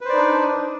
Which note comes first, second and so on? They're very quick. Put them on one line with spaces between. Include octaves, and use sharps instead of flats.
B4 C5 D5 D#4 D4